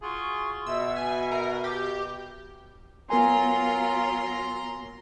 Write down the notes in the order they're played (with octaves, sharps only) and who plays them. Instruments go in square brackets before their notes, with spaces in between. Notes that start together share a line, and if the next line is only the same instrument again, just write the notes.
[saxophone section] F4 F#4 G#4 [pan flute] C#6
[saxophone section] B2 [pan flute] E5 [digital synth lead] E6
[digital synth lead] G#5
A#4
[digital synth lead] G4 [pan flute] D6
[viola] F#3 F4 [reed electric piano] B3 A#4 G#5 [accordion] A#5 C6